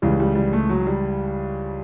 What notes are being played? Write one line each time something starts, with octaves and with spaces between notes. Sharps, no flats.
C#2 C#3 E3 G3
G3
G3
A3
F#3
G3